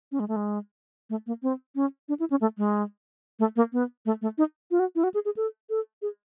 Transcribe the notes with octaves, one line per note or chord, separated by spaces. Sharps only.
C#4
G#3
A3
G#3
A3
A#3
C4
C#4
D4
E4
C#4
A3
G#3
A3
A#3
B3
A3
A3
D#4
F4
F#4
E4
F#4
G#4
G#4
A4
A4
G#4